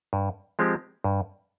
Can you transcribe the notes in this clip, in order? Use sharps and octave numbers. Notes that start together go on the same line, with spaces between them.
G2
F3 G#3 C4 G4
G2